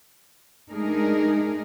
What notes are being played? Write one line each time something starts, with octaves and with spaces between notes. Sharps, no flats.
G#3 A3 D4 D#4 G#4 A#4